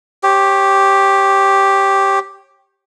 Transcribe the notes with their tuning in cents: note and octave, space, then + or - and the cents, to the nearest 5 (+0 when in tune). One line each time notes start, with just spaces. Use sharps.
G4 +0 C#5 -30